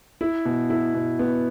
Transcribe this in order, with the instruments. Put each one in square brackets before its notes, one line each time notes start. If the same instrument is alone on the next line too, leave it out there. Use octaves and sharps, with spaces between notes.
[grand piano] E4
B2
E4
B2
B3